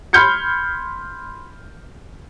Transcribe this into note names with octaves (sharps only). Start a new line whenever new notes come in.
B5 C6 F6 G6 G#6 C#7